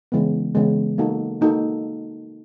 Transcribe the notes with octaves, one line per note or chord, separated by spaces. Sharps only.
C#3 E3 G#3 B3
C#3 E3 G#3 B3
A#3 D#4 F#4 A4
A#3 D#4 F#4 A4